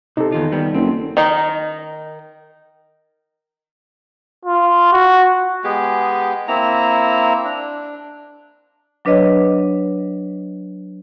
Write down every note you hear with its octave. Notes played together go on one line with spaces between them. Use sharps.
C3 D#4 A4
E2 D#3 F4
D#3 G3 B3
F#1 C4
D#3 D#4
F4
F#4
G#3 B3 G4 G#4
A#3 C4 E4 A#5
D4
F#3 D4 B4 C#5 D#5